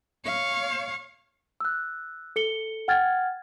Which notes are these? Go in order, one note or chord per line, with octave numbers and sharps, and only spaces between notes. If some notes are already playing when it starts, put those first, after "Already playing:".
C#5 F5
E6 F#6
A4 C#7 G7
F#5 G5 F6 G#6 A6